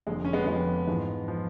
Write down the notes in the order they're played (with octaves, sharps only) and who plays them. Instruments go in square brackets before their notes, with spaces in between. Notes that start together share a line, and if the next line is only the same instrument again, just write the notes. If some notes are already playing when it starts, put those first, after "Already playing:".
[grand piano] F1 F2 D3 F3 G#3
C#4
G#3 B3
F1 F2 D3 F3 G#3 B3
A1 G#2 F3
F3